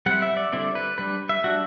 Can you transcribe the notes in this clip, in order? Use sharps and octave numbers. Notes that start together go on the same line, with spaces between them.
G3 C4 E4 F#5
E5
D5
D3 G3 C4 E4 D5
B4
G3 D4 B4
E5
G3 D4 F#4